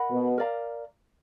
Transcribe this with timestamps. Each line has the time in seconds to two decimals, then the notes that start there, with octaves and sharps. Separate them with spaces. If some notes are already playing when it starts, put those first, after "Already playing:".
Already playing: A#4 D#5 F#5 B5
0.11 B2
0.38 A#4 D5 F5 A#5